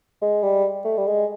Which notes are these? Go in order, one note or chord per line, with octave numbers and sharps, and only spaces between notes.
G#3
G3
A3
G3
G#3